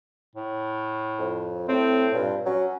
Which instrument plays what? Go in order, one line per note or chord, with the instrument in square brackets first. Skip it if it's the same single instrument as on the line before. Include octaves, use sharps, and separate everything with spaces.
[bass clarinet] A2
[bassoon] F2
[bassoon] A2 [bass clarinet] C4
[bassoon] G2 [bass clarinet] A#2
[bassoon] F#3 [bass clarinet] C#4